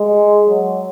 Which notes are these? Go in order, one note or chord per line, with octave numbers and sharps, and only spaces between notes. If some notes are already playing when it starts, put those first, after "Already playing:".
Already playing: G#3
F#3